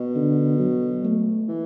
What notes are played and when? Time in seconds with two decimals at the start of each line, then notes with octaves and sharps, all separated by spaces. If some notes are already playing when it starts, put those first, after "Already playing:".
Already playing: B2
0.15 D3
0.60 F#3
1.05 A3
1.48 E3